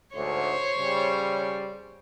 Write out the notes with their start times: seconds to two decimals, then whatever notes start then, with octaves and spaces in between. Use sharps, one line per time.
0.15 D2 G#2 C5 C#5
0.78 C#3 G3